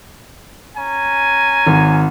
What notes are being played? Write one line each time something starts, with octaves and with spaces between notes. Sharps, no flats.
C#4 G#5 A#5
G#1